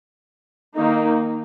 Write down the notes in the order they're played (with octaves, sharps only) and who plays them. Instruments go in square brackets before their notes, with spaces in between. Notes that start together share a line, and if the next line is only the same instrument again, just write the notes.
[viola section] D#3 A#3 D#4